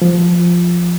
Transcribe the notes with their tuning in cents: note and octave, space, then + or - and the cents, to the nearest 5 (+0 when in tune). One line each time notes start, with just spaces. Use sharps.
F3 +0